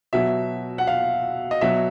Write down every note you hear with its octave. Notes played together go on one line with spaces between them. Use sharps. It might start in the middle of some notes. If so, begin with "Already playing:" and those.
B2 F#3 E5
F#5
F5
D#5
B2 F#3 E5